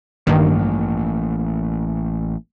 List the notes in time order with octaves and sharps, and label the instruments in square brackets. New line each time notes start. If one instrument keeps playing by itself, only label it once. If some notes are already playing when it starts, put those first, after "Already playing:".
[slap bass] A1 A#3 [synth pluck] G2 D#3